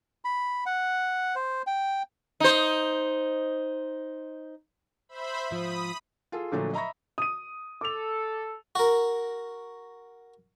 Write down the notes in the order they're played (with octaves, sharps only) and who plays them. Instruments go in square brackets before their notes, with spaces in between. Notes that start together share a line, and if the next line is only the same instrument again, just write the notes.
[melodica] B5
F#5
C5
G5
[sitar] D#4 C5
[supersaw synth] C5 E5 B5
[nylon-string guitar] G#2 F3 [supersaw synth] B5 D#6
[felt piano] F4 G#4 A4
A#2 D3 F3 F#3 A3
D#5 E5 A#5 B5 C#6 A#6
[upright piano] D#6 D#7
[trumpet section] A4 [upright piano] D6 F7
[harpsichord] F#4 A#4